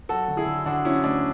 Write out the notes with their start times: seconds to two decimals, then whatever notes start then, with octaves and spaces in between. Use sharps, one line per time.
0.09 F#3 F#4 A4
0.28 D3
0.37 E4 G#4
0.46 D3
0.66 D3 D4 F#4
0.85 F#3 C#4 E4
1.03 D2 D4